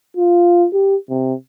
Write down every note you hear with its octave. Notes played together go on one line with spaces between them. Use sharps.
F4
G4
C3